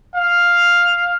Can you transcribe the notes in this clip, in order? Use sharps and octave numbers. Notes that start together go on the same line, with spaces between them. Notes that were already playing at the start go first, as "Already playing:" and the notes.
F5